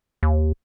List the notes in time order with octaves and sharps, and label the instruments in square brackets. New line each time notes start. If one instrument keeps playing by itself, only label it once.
[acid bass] D#2